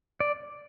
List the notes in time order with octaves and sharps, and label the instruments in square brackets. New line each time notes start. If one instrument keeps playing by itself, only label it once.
[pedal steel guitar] D5